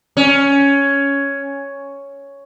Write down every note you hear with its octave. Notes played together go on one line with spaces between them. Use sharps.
C#4